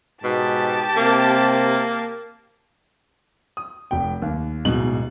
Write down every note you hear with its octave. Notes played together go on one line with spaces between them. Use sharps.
G#2 B2 G4 A5
C3 A#3
D#6
F1 G5
D#2
D1 G#2 B2 D#4 F#7